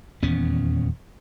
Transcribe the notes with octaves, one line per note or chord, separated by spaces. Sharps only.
D#1 E2 B3 C#4